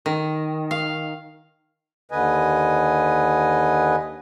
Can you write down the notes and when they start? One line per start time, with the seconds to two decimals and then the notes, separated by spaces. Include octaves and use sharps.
0.06 D#3
0.71 F5
2.11 D#2 D3 B4 D#5 G#5